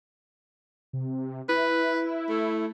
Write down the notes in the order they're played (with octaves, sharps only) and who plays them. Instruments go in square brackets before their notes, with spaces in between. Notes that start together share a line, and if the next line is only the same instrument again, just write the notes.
[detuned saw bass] C3
[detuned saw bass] E4 [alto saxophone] B4
[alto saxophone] A3